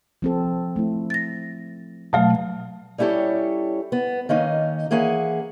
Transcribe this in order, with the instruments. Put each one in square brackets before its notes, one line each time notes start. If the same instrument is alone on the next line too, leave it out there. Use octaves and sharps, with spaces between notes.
[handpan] F3 C4 A4
A3 E4
[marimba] A6 A#6
[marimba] B2 F#3 A3 [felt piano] F5 A5
[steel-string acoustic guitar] G3 C#4 E4 G4 A4 C#5
B3
D#3 A#3 C#4 D#4
E3 A#3 C#4 G#4 F#5